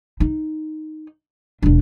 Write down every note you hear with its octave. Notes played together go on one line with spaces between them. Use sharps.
D#4
E1 D4